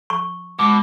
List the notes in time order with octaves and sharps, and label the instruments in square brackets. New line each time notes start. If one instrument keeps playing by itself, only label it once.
[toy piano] C#6
[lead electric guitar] B2 [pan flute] G#3 [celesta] D6